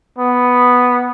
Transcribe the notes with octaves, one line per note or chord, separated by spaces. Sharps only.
B3